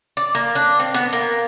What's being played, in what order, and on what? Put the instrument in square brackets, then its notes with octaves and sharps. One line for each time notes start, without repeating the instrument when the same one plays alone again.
[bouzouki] D5
A#3
D4
C4
B3
A#3